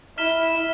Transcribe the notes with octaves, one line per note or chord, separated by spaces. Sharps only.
E4 F6 B6 E7 G7